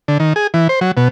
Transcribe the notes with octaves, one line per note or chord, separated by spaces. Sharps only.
D3
D#3
G#4
E3
C5
F#3
B2